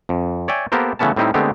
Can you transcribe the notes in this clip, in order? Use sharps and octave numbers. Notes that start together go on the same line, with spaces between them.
F2
C#5 D5 E5 G5 G#5
A#3 B3 G4 A4 A#4 C5
C#3 E3 A3 B3 C#4 A5
A2 G3 C4 D#4 E4
D3 G#3 A3 B3 C4 G4